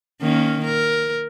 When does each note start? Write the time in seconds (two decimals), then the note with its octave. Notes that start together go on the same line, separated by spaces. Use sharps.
0.21 D#3 A#3 C#4
0.64 A#4